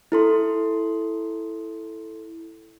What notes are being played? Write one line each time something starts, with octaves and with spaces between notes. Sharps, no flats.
E4 A4 C6